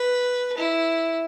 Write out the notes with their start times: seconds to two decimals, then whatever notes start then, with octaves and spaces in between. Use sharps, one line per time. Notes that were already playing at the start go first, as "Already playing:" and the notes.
Already playing: B4
0.57 E4